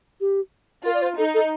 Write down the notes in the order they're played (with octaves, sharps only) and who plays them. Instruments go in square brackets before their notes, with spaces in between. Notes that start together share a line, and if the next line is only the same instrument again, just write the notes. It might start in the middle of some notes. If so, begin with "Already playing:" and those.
[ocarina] G4
[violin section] F4 [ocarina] A#4
[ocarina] D5
C5
[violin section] D#4 [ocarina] A4
[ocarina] A4